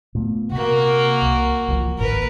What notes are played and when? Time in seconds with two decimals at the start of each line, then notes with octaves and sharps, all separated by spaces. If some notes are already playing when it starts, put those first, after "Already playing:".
0.15 A#2 A3 B3
0.52 C3 A#3 F#4
1.22 C2
1.68 C2 E3 F3
1.99 G#1 A#2 A#4 B4